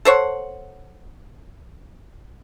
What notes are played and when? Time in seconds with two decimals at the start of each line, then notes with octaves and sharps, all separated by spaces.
0.05 A4 C5 C#5 F#5